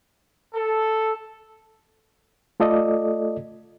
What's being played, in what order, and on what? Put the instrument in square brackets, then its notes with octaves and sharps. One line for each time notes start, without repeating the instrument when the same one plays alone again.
[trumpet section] A4
[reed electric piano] A3 F4 A4 D5 D#5